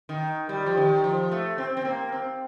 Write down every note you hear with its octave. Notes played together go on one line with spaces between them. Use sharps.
D#3
G3
F3
D#3
F3
A3
C4
C4
A#3
C4